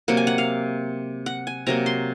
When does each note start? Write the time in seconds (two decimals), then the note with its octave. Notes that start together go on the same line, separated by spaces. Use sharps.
0.08 C3 F#3 A#3 F#5
0.17 G#5
0.27 F#5
0.38 F5
1.26 F#5
1.47 G#5
1.66 C3 F#3 A#3 A#5
1.86 C6